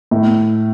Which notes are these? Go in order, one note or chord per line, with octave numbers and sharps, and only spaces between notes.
A2